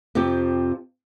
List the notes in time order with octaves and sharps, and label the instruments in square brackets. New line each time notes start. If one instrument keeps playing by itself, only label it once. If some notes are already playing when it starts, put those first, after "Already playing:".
[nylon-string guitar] F2 C3 F3 G4